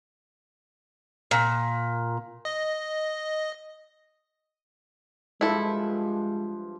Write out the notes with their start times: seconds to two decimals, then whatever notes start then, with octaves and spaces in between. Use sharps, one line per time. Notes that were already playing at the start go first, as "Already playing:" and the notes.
1.31 A#2
2.45 D#5
5.41 G2 F3 G#3 E4 A4